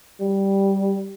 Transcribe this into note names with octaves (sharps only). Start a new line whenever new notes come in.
G3